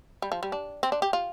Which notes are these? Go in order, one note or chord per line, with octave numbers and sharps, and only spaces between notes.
G3
F3
G3
D4
C4
D4
G4
F4